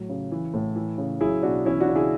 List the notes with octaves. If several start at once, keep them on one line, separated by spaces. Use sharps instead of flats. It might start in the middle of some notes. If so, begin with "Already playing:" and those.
Already playing: A2 F#3
C#3
E3
A2
E3
C#3
F#3 E4 G#4
B2 D4 F#4
E3 C#4 E4
D4 F#4
C#3
E4 G#4